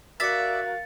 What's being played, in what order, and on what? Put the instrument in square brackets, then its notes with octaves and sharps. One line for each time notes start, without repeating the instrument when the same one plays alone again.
[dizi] F#4 [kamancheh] A#4 F5 [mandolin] D5 E5 [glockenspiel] A6 C#7